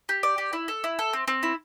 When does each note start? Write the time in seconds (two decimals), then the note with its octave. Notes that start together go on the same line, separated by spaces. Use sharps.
0.09 G4
0.23 D5
0.38 G4
0.53 E4
0.68 A4
0.84 E4
0.99 A4
1.13 C4
1.28 C4
1.43 E4